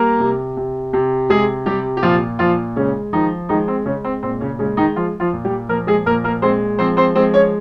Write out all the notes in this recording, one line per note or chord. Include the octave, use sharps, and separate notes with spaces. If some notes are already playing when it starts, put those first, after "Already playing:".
Already playing: G3 A#3 A#4
C3
C3
C3
C3 G#3 G#4
C3 G3 G4
G4
A#2 F3 F4
A#2 F3 F4
C#3 G#3 C#4
D#3 F3 D#4
D#3 G#3 D#4
C4
C#3 G#3 C#4
C4
A#2 C4
C#3 C#4
C#3 G#3 C#4
D#3 D#4
F3 F4
F3 F4
A#2
G3 G4
F3 A#3 A#4
G#3 G#4
A#2 A#3 A#4
A#3 A#4
G#3 C4 C5
F3 C4 C5
C4 C5
G#3 C4 C5
C#4 C#5